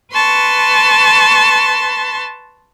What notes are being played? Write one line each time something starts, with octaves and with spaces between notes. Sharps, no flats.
B4 A5 C6 C#6